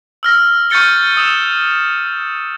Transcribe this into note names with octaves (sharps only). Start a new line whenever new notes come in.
E6 F6 A#6
C#6 F6 G6 A6 C#7 G7
D#6 E6 E7